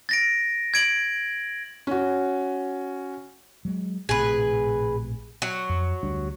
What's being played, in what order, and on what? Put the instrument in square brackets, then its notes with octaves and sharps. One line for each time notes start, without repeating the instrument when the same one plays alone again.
[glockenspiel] A6 A#6 D7
G#6 D7 F#7
[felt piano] C#4 F#4
[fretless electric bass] F#3 G#3
[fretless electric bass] A#1 A2 C3 [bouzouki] G#4 B4
[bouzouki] F#3
[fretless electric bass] F2
D2 G3 D4